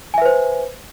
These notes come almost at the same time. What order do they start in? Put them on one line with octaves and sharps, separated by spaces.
G#5 E5 B4 C5